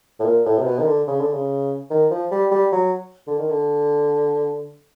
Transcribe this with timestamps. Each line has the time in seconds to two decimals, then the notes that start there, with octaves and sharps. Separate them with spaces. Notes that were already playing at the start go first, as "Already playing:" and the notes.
0.20 A2
0.25 A#2
0.46 A2
0.58 C3
0.66 B2
0.79 D#3
0.86 D3
1.07 C#3
1.20 D3
1.33 C#3
1.90 D#3
2.11 F3
2.31 G3
2.51 G3
2.72 F#3
3.27 D3
3.38 D#3
3.50 D3